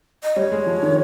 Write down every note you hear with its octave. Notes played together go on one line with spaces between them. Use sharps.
D#5
G3 C#5
G#3
F3
D#3